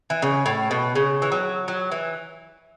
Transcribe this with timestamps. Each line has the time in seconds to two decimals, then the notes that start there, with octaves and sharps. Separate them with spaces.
0.10 E3
0.22 C#3
0.46 A2
0.71 B2
0.95 C#3
1.22 E3
1.32 F#3
1.68 F#3
1.91 E3